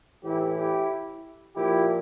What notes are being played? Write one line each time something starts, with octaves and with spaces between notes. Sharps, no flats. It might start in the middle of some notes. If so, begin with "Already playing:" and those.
A2 E3 E4 G4
E4 G4
A#2 F3 E4 G4